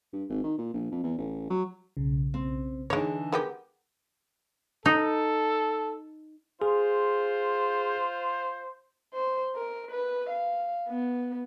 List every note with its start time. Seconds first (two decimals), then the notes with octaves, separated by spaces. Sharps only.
0.13 G2
0.29 G#1
0.43 D#3
0.58 A#2
0.74 A#1
0.91 F2
1.03 E2
1.18 A1
1.50 F#3
1.97 B1 C#3
2.34 C4
2.90 D3 E3 G#3 D#4 C#5
3.32 G#3 B3 G4 A#4
4.86 D#4 A4
6.62 F4 G#4 C5
9.14 C5
9.55 A#4
9.91 B4
10.30 F5
10.88 B3